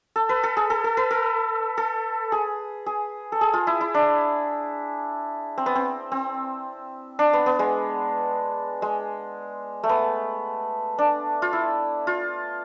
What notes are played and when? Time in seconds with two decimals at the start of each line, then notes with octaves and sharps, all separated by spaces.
0.16 A4
0.29 B4
0.43 A4
0.57 G#4
0.70 A4
0.84 A4
0.97 B4
1.11 A4
1.78 A4
2.32 G#4
2.86 G#4
3.32 A4
3.41 G#4
3.53 F4
3.67 E4
3.81 E4
3.94 D4
5.58 C4
5.66 B3
5.75 C4
6.12 C4
7.19 D4
7.33 B3
7.46 B3
7.59 G#3
8.82 G#3
9.84 A3
9.89 B3
10.98 D4
11.42 F4
11.53 E4
12.07 F4